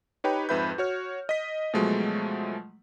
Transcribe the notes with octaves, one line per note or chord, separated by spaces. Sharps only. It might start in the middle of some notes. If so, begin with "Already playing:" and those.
D#4 G4 B4 C#5 G5 B5
F2 G#2 B4 E5 B5 G6
F#4 C#5 F6
D#5 B6
B2 F3 F#3 G#3 A3